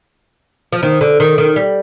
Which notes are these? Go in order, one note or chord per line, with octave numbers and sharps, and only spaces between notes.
F3
D#3
D3
D#3
D#3
G3